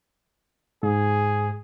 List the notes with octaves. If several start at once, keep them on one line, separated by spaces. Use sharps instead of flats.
G#2 G#4